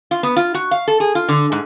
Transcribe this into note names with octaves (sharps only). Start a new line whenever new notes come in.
F4
B3
F4
F#4
F5
A4
G#4
F4
D3
G#2